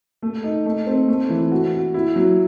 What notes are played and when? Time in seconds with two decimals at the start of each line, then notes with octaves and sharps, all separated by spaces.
0.23 A3
0.44 D#4
0.66 A3
0.87 C4
1.08 A3
1.30 E3
1.52 F#4
1.73 F#4
1.94 E4
2.16 F#3